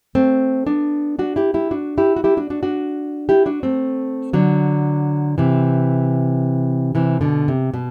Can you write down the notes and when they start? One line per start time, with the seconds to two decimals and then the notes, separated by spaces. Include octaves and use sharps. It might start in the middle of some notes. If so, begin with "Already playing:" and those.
0.15 A3 C4
0.67 B3 D4
1.19 D4 F#4
1.36 E4 G4
1.54 E4 G4
1.71 D4 F#4
1.98 E4 G4
2.16 F#4
2.24 E4 G4
2.37 D4 F#4
2.50 D4 F#4
2.63 D4 F#4
3.29 E4 G4
3.46 D4 F#4
3.63 A3 C4
4.33 D3 F#3
5.38 C3 E3
6.95 C3 E3
7.21 B2 D3
7.48 C3
7.74 B2